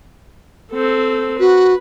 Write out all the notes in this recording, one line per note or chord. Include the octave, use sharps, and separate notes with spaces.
C4 A4
F#4 B4